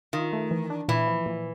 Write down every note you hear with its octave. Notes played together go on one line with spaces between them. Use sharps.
D#3 F4
A3
E3
D4
A#2 E3
F3
A#2